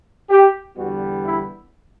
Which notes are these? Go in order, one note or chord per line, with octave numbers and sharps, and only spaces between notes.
G4
E2 D3 G3 B3 F#4
E4